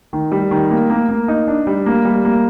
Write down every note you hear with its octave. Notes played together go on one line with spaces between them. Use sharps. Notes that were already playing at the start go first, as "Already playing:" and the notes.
D#3
G3
D#3
A#3
A#3
A#3
D#4
D4
G3
A#3
G3
A#3